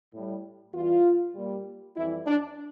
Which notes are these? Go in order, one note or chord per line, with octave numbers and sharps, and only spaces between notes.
A2 G3
E2 E3 G3 F4
A#2 G3
F2 E3 G3 E4
D4